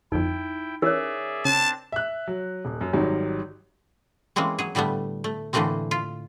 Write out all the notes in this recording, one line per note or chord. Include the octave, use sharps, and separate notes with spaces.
G1 F2 D#4 E4 G5
E3 C#4 G#4 A#4 C#5 D5 E5
C#3 C4 D4 A5
E5 F#6
F#3
D#1
F#2
G#1 D#3 F#3 G3
E3 G#3 A#3 C4 C#4
F#3 G#4
A2 D3 G3 A3 B3
A3
A2 D3 E3 A3 A#3 C4
F4